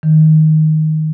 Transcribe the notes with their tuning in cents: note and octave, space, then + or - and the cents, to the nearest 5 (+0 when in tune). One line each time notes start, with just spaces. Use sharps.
D#3 +5